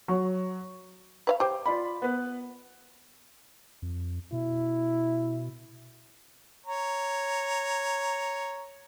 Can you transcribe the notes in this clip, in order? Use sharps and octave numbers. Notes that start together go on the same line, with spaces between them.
F#3
B4 D5 F5
G4 C5 D6
F4 D5 B5
B3 B4
F2
B2 E4
C#5 A#5